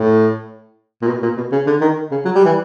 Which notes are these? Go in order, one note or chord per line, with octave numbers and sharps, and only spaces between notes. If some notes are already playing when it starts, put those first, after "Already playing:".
Already playing: A2
A#2
B2
A#2
B2
C#3
D3
D#3
C#3
F#3
G3
E3